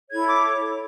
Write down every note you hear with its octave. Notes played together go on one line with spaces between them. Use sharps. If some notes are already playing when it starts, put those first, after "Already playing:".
E4 A4 C#5 G#6
D6